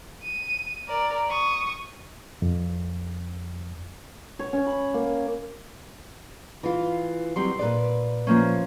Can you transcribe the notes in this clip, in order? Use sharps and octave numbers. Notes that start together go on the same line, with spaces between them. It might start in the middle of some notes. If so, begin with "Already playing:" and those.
D#7
A#4 D5
C#6 D#6
F2
C#5
C#4
B5
A#3
E3 F4
F#3 G3 C4 C6
A#2 B4 D5
F3 A#3 C#4